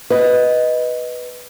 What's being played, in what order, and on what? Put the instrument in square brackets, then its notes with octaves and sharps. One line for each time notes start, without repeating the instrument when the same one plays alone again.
[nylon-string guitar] B4 D#5